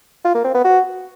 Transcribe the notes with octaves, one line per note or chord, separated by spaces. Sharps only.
F4
A#3
C4
B3
F#4